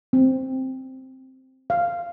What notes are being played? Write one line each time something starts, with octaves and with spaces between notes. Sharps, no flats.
C4
F5